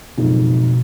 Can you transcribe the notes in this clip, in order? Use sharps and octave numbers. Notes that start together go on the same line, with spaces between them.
F#1 F2 G#2 B2